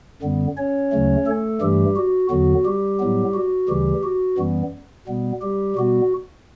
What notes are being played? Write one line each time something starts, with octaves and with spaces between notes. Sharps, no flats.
F#2 D3 G3 B3
C#4 C#5
D2 C#3 F#3 A3
A3 A4
G2 E3 G3 A3 G4
F#4
E2 D3 F#3 B3 F#4
G3 G4
A2 F#3 B3
F#4
D2 C#3 E3 G3 G4
F#4
F#2 E3 G3 B3
B2 G3 B3
G3 G4
B2 G3 B3 F#4